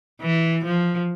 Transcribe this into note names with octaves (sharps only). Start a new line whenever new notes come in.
E3
F3